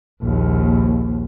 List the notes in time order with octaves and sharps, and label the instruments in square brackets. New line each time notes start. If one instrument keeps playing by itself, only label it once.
[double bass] A#1 D#2